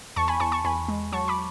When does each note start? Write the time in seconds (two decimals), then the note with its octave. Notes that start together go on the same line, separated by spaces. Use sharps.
0.16 E2 A5 C#6
0.28 G#5 B5
0.40 E2 A5 C#6
0.52 A5 C#6
0.64 E2 G#5 B5
0.88 G#3
1.12 F#3 A5 C#6
1.28 B5 D6